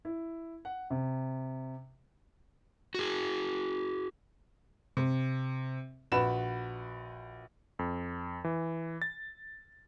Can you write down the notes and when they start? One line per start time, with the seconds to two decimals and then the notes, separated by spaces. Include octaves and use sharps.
0.05 E4
0.65 F#5
0.90 C3
2.94 F#4 G#4
4.97 C3
6.12 A#1 F#4 B4 B5 E7
7.79 F2
8.44 E3
9.02 A6